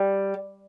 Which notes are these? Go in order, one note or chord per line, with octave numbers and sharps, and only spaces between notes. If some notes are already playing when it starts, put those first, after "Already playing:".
Already playing: G3